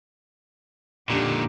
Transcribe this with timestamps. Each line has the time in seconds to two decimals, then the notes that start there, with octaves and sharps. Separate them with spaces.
1.10 A#2 D3 D4 D#4 G4